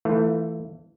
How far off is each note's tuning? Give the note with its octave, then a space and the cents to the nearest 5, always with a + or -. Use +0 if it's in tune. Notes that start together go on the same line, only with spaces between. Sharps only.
E3 +0 A3 +20 F4 +0